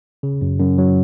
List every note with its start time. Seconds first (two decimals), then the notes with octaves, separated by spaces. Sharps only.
0.23 C#3
0.41 F#2
0.59 F#2
0.78 F#3